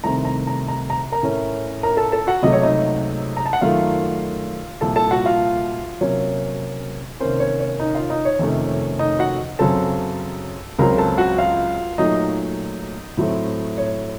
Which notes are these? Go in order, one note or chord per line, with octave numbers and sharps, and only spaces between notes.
C2 C3 D#3 A3 C4 A#5
A#5
A#5
A#5
A#5
A#4 A#5
A2 A3 C#4
A#4 A#5
A4 A5
A4 A5
F#4 F#5
C#2 C3 F#3 A3 D#5
C#5
D#4 D#5
A#5
A5
F#5
F#2 D#3 A3 F4 F5
C2 A#2 F3 A4 A5
A4 A5
F#4 F#5
F4 F5
C3 F#3 A#3 C#4 C#5
C3 D#3 A#3 C#4 C5
C#5
C#5
D#4 D#5
F4 F5
D#4 D#5
C#5
F2 C3 D#3 A3 C#4
D#4 D#5
F#4 F#5
F#2 C#3 F#3 C4 A4 A5
C#2 C#3 F#3 C4 A#4 A#5
A4 A5
F#4 F#5
F4 F5
A#2 F#3 A3 D#4 D#5
A2 F#3 A3 C4
C#5